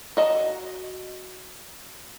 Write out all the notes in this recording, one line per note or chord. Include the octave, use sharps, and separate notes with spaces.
F#4 D#5 A5